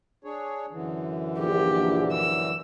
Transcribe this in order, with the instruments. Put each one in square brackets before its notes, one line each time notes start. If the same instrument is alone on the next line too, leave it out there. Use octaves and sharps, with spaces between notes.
[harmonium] D4 G#4 C#5
F#2 D3 E3
[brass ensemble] A#1 [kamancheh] G4
[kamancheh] E6